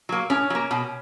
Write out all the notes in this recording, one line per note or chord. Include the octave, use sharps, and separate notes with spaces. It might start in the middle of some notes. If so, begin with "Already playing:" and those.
F#3 A#3
A2 C#4
F#3
A#3
B2